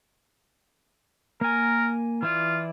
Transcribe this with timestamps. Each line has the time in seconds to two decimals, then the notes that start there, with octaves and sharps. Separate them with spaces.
1.41 A#3 A#4 G#5
2.23 E3 E4 F4 D5